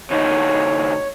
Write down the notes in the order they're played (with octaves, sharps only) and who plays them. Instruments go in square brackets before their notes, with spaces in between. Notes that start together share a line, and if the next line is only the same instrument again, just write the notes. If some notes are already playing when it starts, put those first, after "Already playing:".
[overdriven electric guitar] D2 D#4 [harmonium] C#5